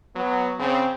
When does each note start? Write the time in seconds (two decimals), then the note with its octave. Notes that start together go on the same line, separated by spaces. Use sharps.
0.16 F#3 B3
0.59 C#3 C4